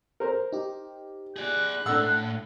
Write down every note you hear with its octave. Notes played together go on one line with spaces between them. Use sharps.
A#4 C5
D#4 G4
G#4 D5 F#6
A2 D4 A4 F#5 E6